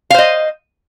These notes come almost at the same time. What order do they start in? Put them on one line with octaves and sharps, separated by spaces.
F5 C5 D#5